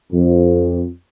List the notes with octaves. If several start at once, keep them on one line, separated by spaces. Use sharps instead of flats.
F2